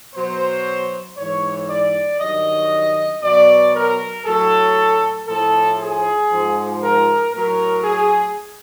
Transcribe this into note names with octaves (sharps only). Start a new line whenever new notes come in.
B2 F#3 C5
G#2 E3 C#5
D5
G2 D#3 F#3 D#5
B2 F#3 D5
A#4
A2 F#3 A4
A2 F3 A4
G#4
G#2 F3
A#4
A2 F#3 A#4
G#4